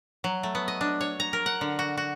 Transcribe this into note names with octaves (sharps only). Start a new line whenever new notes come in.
F#3
A3
B3
D#5
D4
C#5
A#5
A#4
F#5
D3
F#4
F#4